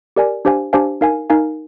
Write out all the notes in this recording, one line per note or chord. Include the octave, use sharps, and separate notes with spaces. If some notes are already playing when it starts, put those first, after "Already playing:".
G4 A#4 D5 G#5
D4 G4 C5 F5 G#5
D4 G4 C5 F5 G#5
D#4 A#4 F5 G#5
D#4 A#4 F5 G#5